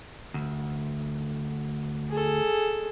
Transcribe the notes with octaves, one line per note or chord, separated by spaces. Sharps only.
D2
G#4 A4